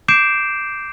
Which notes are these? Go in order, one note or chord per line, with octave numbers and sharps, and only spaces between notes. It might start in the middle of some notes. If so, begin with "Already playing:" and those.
D6 G6 C7 D7 E7